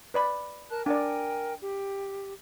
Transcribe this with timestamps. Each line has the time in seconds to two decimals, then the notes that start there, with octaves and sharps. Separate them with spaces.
0.14 B4 D5 B5
0.71 A#4 A5 F#6
0.86 D4 A#4 D5 G5 G#5
1.62 G4